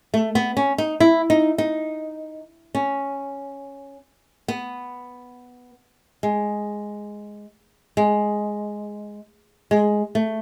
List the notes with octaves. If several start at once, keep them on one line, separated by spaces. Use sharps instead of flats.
A3
B3
C#4
D#4
E4
D#4
D#4
C#4
B3
G#3
G#3
G#3
A3